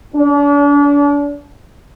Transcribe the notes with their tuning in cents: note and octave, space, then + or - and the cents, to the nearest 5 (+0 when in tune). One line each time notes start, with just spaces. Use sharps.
D4 -40